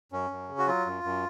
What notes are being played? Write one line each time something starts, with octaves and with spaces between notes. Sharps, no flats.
F#2 C#4
F#2
C#3
F#4
F#3 F4
F#2
F#2